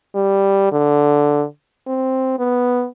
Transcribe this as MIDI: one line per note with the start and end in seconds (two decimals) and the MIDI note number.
0.15 0.72 55
0.72 1.45 50
1.88 2.38 60
2.39 2.86 59